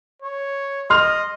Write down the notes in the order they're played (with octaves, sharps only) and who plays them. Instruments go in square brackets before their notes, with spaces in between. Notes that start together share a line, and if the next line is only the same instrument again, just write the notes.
[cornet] C#5
[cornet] D#5 [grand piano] C6 F6